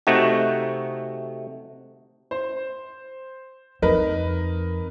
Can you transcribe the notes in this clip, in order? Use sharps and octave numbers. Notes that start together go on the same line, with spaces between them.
C3 A3 D#4 F#4
C5
F2 D#4 A#4 B4